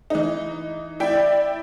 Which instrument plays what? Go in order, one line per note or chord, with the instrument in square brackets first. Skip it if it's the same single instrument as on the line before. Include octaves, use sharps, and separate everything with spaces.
[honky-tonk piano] E3 D#4
[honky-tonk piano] E4 G5 [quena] D5